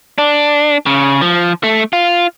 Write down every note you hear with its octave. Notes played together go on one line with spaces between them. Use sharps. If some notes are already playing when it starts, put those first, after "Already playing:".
D4
C#3
F3
A3
F4